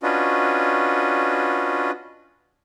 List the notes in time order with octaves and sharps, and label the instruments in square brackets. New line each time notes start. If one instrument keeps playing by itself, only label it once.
[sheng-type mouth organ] C#4 D4 F4 F#4 B4 D#5